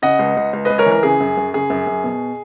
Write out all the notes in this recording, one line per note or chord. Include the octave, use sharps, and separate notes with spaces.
C#3 D#5 F#5
C#2
C#2
C#2
C#2 B4 D#5
A#4 C#5
E3
A#4
C#3 G#4
F#2
F#2
C#3 G#4
F#2
F#2
B2